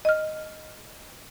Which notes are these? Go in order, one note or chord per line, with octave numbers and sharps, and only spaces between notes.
D#5 F6